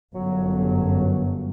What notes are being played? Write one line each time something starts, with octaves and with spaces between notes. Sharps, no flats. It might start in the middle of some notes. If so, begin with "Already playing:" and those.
G1 F#2 F#3